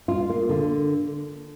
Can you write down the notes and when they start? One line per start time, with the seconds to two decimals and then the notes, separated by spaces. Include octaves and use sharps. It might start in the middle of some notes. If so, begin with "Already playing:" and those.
0.08 F4
0.30 A#3
0.49 D3